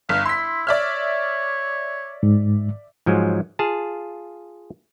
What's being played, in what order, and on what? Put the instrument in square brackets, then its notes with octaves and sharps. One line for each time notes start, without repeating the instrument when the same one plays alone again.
[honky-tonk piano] G1 [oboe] F5
[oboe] E4 [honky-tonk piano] C6 B6
[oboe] C#5 [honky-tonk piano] D5 E5 F6
[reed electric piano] G#2
[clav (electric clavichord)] G#2 F3 F#3 G#3
F4 G#4 F5 A5